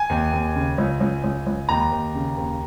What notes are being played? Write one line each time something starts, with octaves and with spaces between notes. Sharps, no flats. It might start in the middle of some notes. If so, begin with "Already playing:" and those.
Already playing: G#5
D#2
D#2
C#3
C#2
C#2
C#2
C#2
D#2 A#5
D#2
C#3
D#2